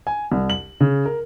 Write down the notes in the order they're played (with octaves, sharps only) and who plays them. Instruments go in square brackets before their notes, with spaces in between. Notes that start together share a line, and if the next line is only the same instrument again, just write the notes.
[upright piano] G#5
C2
F#7
C#3
A#4